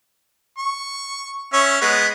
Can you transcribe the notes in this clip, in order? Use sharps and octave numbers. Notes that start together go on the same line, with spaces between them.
C#6
C#4 C#5 E5
G#3 B3